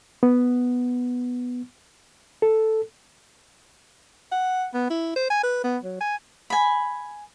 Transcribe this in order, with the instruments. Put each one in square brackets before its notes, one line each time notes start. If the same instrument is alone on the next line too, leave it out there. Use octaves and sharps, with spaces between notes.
[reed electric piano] B3
A4
[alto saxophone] F#5
B3
E4
C5
G#5
B4
B3
F#3
G#5
[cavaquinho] G#5 B5